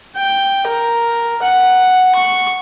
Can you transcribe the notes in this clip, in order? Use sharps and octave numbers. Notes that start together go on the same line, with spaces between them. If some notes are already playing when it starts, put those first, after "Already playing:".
G5
A#4
F#5
C#6